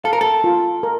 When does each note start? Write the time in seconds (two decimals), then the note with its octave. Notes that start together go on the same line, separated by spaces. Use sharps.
0.04 A4 F5
0.13 A#4
0.21 A4
0.44 F4
0.83 A#4